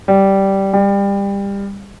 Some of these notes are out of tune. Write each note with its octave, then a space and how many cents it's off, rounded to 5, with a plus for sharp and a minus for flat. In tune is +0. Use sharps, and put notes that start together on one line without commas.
G3 -10
G3 +25